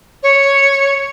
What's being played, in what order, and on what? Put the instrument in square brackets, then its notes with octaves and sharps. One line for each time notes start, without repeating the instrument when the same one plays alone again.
[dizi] C#5